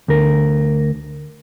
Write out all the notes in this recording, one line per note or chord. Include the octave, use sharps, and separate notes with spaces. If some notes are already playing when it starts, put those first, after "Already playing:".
D2 A#4